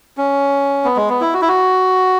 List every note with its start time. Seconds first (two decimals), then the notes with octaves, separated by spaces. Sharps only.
0.17 C#4
0.85 B3
0.96 G#3
1.10 B3
1.21 E4
1.34 F#4
1.42 E4
1.48 F#4